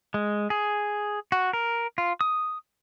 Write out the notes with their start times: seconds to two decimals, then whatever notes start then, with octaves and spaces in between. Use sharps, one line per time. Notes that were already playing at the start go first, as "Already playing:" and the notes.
0.14 G#3
0.50 G#4
1.32 F#4
1.53 A#4
1.98 F4
2.21 D#6